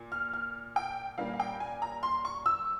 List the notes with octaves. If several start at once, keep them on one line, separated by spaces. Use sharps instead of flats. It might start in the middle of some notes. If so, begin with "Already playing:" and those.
Already playing: A#2
F6
F6
G5
A#2 G3 A#3 C#4 F5
F5
G5
G#5
A#5
C6
C#6
E6